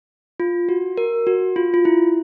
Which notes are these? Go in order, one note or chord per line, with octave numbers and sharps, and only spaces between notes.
F4
F#4
A#4
F#4
F4
F4
E4